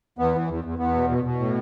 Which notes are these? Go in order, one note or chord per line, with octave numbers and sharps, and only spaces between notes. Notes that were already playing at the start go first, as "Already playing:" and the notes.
E2 B3
E3
E2
E2
E2 B3
B2
B2
B2
A2